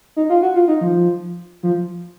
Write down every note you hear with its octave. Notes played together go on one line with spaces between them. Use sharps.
D#4
F4
F#4
F4
D#4
F3
F3